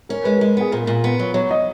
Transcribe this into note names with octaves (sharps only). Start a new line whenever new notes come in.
C#4 A#4
G#3 B4
G#3 A#4
B3 G#4
A#2 A#4
A#2
B3
F#3
F#3 C#5
D#5